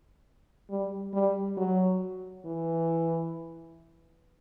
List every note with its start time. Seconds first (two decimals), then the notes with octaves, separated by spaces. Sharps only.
0.70 G3
1.14 G3
1.57 F#3
2.45 E3